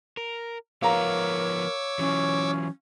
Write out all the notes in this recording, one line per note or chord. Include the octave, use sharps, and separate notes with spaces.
A#4
F3 B3 A#4 C#5 F5 A#5 D6 E6
E3 F#3 C#4